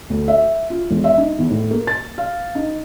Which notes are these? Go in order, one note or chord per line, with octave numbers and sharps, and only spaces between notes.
D2
E5
F4
E1
E5
D#4
E2
A2
A#3
A6
F5
D#4